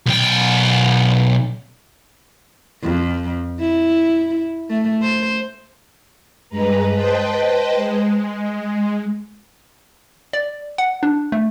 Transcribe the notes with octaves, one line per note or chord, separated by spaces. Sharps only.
B1 G5
F2
E4
A3
C5
G2 G#3 B4 A#5
B4 C5 D#5 G5 A5
G#3
D5
F#5
D4
A3